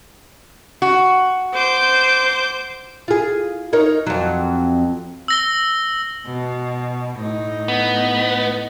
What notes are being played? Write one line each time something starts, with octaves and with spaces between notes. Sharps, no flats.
F#4
C5 D6 G6
F4 G#4
D#4 A#4 C#5
F2 F#3
E6 A#6 G7
B2
A2 D#4
B3